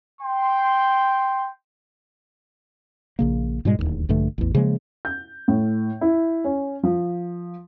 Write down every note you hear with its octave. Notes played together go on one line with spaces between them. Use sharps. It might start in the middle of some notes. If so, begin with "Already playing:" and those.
G5 C6
A#1 C#3 A#3
G#2 B2 G3 G#3
D1 A#1 D#2
A#1 G2 D3 A3
A1 E2
C#3 F3 G#3 A#3
G6
A2
E4
C#4
F3